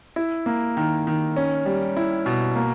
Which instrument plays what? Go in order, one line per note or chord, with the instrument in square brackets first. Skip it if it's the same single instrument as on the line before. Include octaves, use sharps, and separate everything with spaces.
[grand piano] E4
A#3
D#3
D#3
C#4
G3
E4
B2
A#3